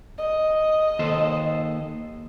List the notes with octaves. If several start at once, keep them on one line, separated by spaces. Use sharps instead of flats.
D#5
D#2 A4 C5